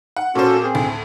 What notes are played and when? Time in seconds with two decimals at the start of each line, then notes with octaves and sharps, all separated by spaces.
0.17 F#5
0.35 A#2 C#4 F#4 A4 C5
0.62 C4 G#4
0.75 D2 A2